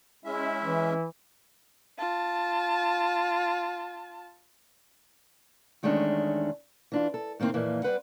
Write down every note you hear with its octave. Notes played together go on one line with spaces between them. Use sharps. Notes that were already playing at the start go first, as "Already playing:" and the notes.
G#3 C#4 E4 E5
E3
F4 A5
E2 D#3 G#3 A3 C#4 D4
E3 D4 F4
A4
A2 D#3 A#3 C4
F2 A#2 E3 A#3
G3 C4 B4 F#5